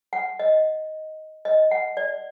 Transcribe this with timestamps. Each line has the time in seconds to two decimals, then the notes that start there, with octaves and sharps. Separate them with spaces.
0.13 F#5
0.39 D#5
1.45 D#5
1.71 F#5
1.97 D5